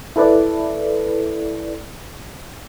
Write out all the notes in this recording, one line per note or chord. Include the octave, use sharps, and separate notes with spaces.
E4 A4 B4 D5